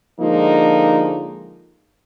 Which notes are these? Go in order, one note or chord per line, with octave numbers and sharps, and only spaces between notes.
D3 F3 G#3 A#3 D#4 F4